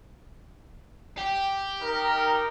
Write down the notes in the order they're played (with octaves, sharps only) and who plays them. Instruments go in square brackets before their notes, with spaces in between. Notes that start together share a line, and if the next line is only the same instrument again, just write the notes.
[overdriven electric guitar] G4
[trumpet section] D#4 A#4